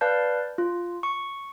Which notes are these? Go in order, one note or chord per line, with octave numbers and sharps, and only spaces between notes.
B4 D5 F5 A5 G6
F4
C#6